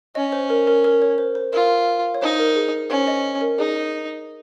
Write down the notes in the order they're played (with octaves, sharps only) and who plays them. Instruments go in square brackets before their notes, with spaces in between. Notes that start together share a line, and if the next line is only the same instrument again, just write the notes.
[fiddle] C#4 [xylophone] D#5
[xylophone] C5
A#4
A#4
A#4
C#5
C5
C5
[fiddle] F4 [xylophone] A#4
[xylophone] C#5
[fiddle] D#4 [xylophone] C5
[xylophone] A#4
G#4
[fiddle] C#4 [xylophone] C5
[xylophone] D#5
A#4
[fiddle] D#4 [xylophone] G#4